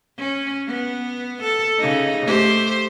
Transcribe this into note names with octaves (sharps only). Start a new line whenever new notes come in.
C#4
B3
A4
C#3 D#4
A3 G4 C5